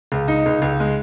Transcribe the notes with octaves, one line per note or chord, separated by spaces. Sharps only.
C#2
D#4
C#2
C#2
G#3